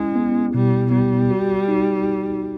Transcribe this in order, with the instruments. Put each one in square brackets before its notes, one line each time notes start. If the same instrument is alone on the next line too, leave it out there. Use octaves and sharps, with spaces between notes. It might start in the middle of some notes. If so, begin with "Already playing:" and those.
Already playing: [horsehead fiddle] G#3 [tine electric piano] C#4 E4
[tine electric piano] B3
[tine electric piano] B2 [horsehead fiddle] G3
[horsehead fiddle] G3 [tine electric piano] B3
[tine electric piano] F#4
D#4